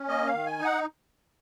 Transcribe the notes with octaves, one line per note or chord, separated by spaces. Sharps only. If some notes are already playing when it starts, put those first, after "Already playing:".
Already playing: C#4
A#3 D#5
F5
D#3
G#5
D#4
F#5